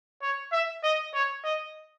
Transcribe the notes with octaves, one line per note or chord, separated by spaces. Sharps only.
C#5
E5
D#5
C#5
D#5